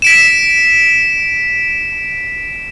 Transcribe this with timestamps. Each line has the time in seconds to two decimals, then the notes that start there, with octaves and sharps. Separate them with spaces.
0.02 B6 D7 E7